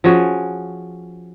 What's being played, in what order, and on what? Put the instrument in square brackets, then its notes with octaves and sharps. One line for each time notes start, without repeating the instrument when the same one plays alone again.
[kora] F3 C#4 F#4 G#4